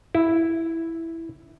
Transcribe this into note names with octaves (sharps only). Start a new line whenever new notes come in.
E4